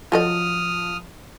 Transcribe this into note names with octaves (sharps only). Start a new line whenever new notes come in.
F3 F#3 A4 D#5 D#6 F6